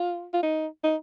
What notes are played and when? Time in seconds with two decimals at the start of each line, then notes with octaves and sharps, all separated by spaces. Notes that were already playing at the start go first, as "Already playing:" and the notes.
Already playing: F4
0.33 F4
0.43 D#4
0.84 D#4